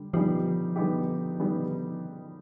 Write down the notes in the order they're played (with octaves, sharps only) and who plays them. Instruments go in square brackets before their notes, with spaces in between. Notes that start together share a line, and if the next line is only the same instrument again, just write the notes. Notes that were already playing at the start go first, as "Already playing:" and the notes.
Already playing: [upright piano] D3 G3
[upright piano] D3 G3 B3 D#4 G4 [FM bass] F3
[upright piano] D3 G3 B3 D#4 G4
D3 G3 B3 D#4 G4